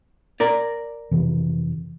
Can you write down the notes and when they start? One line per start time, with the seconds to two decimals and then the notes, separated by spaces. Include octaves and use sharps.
0.40 A#4 D5
1.11 F2 C3 E3